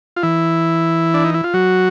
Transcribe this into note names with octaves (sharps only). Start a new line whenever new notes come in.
F4
E3 E4
D4
D#4
E4
F4
F#3 F#4